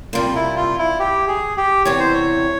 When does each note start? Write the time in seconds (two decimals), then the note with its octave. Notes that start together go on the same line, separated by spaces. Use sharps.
0.13 C3 G3 A#3 F4
0.36 E4
0.57 F4
0.79 E4
1.00 G4
1.28 G#4
1.57 G4
1.85 E2 C3 E3 C#5
1.99 C5
2.14 C#5